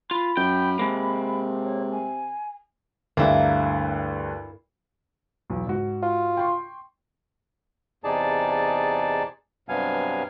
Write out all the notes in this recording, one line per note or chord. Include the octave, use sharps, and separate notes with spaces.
F4 B5
F#2 G5
C3 G#3 A#3
C#5
G#5
D2 G2 A#3 E4
B1 E2
G#2 F#4
F4
G5 C6 C#6
E2 C3 D#4 G#4 D5 A5
G2 C3 F#3 B3 F5 G#5